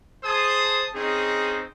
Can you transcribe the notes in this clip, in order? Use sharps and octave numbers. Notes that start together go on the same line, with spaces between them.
G#4 C5 A5 D#6
C4 C#4 D#4 G#4